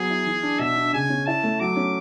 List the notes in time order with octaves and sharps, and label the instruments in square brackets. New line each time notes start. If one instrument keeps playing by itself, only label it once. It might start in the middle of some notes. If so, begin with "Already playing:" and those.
Already playing: [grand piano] F#3 B3 [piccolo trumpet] G#4
[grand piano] E4
E3
D4
[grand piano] B2 [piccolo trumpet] E5
[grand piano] D4
[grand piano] C#3 [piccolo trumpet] G#5
[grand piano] C#4
[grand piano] E4 [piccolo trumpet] A5
[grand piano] A3
[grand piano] F#3 [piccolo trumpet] D6
[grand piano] C#4